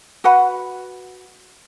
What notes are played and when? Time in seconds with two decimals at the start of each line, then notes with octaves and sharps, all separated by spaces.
0.24 F#4 B4 F#5 B5